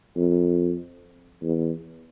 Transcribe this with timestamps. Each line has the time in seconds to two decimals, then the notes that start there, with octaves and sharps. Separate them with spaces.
0.16 F2
1.42 E2